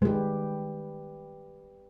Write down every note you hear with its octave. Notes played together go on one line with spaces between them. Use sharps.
D#3 G#3 G4 B4